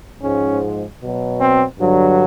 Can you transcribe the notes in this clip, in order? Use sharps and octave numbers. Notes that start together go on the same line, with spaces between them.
G#2 F3 G#3 C#4
B2 F#3
C4
G2 D3 F#3